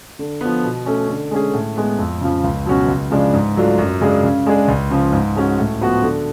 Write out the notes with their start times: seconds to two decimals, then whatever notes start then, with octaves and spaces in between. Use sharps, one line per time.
0.19 D3
0.41 F3 B3
0.64 B2
0.86 A3 C#4
1.08 D3
1.31 G#3 C#4 G#4
1.53 A2
1.76 G#3 B3
1.98 F2
2.21 C#3 F3
2.44 C#2
2.66 B2 F#3 C#4 F#4
2.88 C#2
3.10 C#3 F3 G#3 D4
3.33 G#2
3.56 F#3 A3 D4 F4
3.78 F#2
4.01 C#3 G#3 D4 G#4
4.23 C#3
4.46 G#3 D4 G#4
4.68 C#2
4.90 C#3 F3
5.13 G#2
5.36 G#3 C#4 F#4
5.59 A2
5.81 F3 B3 F#4
6.02 D3